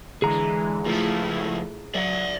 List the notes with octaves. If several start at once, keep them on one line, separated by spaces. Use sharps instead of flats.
D3 E3 G#3 G#4 A#5
C#2 F3 A3 E4 F4
F#3 D5 E5